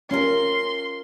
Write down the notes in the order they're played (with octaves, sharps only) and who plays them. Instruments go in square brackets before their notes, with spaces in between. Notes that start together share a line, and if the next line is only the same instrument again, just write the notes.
[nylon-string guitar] C#4 F4 A#4 [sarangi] C6